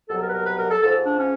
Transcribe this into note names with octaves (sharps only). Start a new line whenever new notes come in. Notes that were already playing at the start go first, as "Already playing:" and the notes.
C2 B2 F#3 A4
A#4
B4
A#4
B4
A#4
A4
G#2 F3 A4
D4
C#4